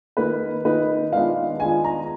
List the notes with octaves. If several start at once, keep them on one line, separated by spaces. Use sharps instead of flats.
D#3 A#3 D#4 B4
D#3 A#3 D#4 B4
D#3 G#3 B3 D4 F4 F5
D#3 G#3 B3 D4 F4 G#5
A#5